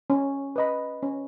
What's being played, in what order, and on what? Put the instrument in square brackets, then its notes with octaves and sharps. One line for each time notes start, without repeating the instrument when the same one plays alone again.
[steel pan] C#4
B4 D#5 B5
C#4